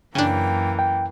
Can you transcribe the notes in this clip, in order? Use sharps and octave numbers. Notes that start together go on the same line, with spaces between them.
F#2 C#3 E3 A#3 D4 G5
G5